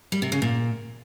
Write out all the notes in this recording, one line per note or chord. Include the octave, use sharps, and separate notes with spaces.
G3
C3
C#3
A#2